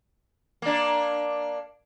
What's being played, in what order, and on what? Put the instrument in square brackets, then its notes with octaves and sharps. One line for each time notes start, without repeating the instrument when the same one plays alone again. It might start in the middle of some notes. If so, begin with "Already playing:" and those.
[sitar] A#3 D4